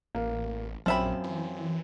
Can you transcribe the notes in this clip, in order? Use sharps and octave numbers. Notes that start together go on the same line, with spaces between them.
A1 A#3
A#1 F#2 F3 C4 E5 G5 B5
E3